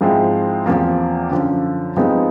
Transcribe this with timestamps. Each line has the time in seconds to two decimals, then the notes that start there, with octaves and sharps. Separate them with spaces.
0.01 G#2 F3 G#3 C4 E4
0.66 E2 C3 F3 A#3
1.30 F#2 D3 F3
1.96 C3 F3 G#3 B3 D#4